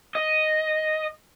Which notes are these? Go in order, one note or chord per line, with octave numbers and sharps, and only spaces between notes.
D#5